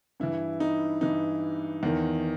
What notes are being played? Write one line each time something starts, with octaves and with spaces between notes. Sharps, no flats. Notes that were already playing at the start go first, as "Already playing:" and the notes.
G2 E3 E4
D#4
G2 E3 D#4
E2 D#3